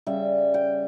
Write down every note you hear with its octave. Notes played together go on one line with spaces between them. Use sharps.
C#3 G3 E5
G5